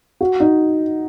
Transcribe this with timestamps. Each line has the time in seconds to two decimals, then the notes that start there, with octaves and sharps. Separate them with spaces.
0.21 F#4
0.40 D#4